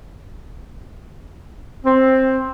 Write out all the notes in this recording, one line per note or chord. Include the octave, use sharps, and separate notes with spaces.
C4